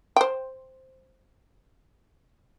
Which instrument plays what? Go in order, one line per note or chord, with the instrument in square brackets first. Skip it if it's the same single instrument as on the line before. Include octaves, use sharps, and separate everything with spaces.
[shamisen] C5 G5